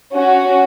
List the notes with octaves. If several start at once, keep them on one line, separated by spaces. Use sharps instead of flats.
C#4 F#4